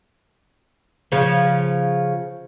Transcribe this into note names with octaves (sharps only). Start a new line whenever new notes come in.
C#3 F3